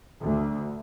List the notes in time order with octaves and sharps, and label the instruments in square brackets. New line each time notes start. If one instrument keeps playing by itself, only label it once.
[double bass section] D2